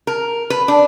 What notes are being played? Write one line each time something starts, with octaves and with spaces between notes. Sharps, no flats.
A#4
B4
D4